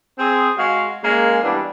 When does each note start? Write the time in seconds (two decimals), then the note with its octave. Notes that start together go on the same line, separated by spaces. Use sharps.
0.18 C4 G#4
0.58 G#3 F#4 F5
1.04 G#3 A#3 C#4
1.43 E3 G3 B3 D4